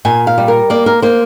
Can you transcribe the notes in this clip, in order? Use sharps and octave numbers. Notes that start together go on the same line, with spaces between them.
A#2 G#5
F5
G3
A#4
A#3 D5
A#4
A#3 C5